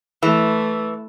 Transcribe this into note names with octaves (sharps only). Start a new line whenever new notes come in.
E3 A3